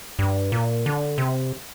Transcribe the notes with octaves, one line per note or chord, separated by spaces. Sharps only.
G2
A#2
D3
C3